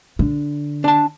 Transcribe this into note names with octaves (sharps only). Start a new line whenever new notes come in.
D3
D4 A5